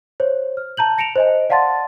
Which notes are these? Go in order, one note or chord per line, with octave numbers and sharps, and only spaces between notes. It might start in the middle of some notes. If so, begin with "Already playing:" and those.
C5 C#5
F6
A5 A#5 G6 F#7
A#6 C#7 D7 E7 F7
C5 D#5 G#5
D5 F5 F#5 A5 C6 A6